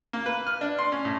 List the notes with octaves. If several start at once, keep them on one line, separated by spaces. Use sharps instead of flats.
A#3
B4
F6
D4
C6
C#4
A2